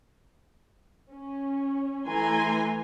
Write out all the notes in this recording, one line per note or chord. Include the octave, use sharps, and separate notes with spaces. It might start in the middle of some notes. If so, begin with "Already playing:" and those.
C#4
E3 A3 G#5 A#5 C6